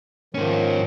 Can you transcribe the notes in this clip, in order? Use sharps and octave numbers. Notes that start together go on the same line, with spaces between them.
G#2 D#3 F3 C#4